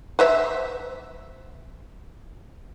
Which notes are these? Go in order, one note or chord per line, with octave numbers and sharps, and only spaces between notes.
B4 C5 E5